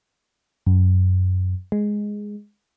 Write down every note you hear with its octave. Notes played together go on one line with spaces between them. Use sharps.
F#2
G#3